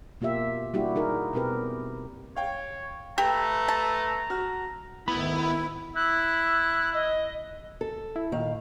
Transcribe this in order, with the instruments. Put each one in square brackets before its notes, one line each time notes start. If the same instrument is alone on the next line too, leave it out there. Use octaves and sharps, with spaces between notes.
[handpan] B2 A#3 F4 G4 E5
G3 A#3 D4 E4 F#4 G4
D#4 G#4 A#4
B2 C4 G4 A#4 B4
[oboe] C#5 [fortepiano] F5 G5
[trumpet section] A3 B4 [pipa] G4 [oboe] A#5
[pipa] A5
[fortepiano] F#4 F6
[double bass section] D2 G#2 D#3 [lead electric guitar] B3 [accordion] E4 [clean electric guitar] B5
[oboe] E4 [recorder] F#6
[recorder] D#5
[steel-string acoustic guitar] A4
[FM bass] E4
[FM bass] A#2 [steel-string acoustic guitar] D#3 F5